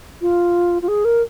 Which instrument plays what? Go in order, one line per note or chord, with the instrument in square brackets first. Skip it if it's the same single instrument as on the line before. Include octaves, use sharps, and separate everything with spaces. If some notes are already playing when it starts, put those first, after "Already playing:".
[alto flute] F4
F4
G#4
A#4